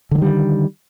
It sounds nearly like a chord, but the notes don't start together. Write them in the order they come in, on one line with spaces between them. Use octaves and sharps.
D3 F#3 D#3 G3